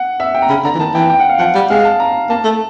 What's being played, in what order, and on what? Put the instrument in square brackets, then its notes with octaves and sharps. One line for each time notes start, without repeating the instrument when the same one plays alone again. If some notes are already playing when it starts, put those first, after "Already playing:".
Already playing: [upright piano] F#5
E5
G5
A#5
[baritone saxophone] C#3 [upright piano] B5
[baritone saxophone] D3 [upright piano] A#5
[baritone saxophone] E3
[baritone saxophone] D#3 [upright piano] A5
[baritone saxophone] E3 [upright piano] G5
[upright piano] G5
F#5
F5
[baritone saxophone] F3 [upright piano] F#5
[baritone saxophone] G3
[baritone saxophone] G#3 [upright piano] F5
[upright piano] A5
A#5
[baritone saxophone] A#3 [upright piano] A5
[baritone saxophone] A3